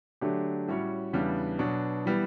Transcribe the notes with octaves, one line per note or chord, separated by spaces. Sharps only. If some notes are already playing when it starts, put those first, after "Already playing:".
D3 F#3 A3 D4 G4
A2 G3 C#4 F#4 C#5
E2 C#3 G3 B3 D4
B2 F#3 B3 D4
E3 G3 B3